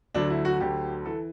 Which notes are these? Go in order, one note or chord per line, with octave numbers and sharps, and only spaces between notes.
D2 D3 F#3 D4
E4
F#4
D2 D3 F#3 G4
E3 A4